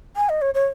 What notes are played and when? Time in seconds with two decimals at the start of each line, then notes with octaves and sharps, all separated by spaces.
0.16 G#5
0.29 D#5
0.41 C#5
0.54 C#5